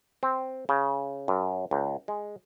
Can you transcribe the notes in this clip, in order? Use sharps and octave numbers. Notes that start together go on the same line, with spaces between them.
C4
C#3
F#2
C#2
G#3